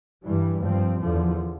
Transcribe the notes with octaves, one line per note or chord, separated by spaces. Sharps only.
G2 E3 G3
G2 F3 C4
E2 D3 F3